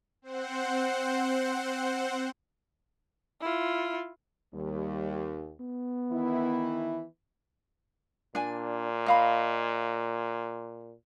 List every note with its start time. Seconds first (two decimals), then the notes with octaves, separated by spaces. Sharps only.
0.22 C4 C5 F#5
3.41 E4 F4
4.54 D#2 G3
5.61 B3
6.12 D#3 E3 E4
8.35 A#2 D4 G#5
9.06 D#5 F5 B5